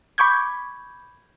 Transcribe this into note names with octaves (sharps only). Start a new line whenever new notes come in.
B5 C#6 D6 G6 G#6